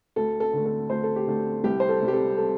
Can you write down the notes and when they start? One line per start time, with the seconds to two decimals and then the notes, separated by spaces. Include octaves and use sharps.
0.16 D2 A4
0.40 A4
0.53 D3 A3
0.66 A4
0.90 D2 C5
1.03 A4
1.16 G4
1.27 D3 A3 A4
1.64 C2 G4
1.80 C5
1.89 A4
2.01 C3 G3
2.08 G4
2.13 A4
2.38 A4